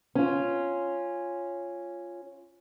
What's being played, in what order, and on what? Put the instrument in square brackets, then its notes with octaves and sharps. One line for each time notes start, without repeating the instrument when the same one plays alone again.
[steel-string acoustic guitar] C#4 F4